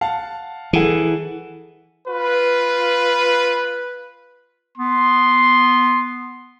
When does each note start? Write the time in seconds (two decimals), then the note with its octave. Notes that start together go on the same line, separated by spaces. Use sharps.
0.01 F5 F#5 A5
0.73 E3 G#4 A4 F#5
2.07 F4 B4
4.77 B3 C6